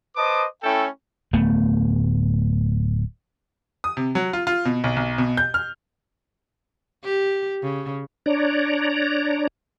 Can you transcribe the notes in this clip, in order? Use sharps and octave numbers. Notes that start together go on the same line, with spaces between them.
B4 C5 D#5 A5 D6 D#6
A3 C#4 E4 A4 G5
D1 A3 B3
D#6
C3
F#3
F4
F4
B2
B1
B1
B2
G6
F6
G4
C#3
D4 C#5 D5 A#5